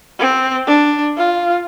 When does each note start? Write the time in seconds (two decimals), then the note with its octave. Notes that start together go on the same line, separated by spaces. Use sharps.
0.19 C4
0.67 D4
1.18 F4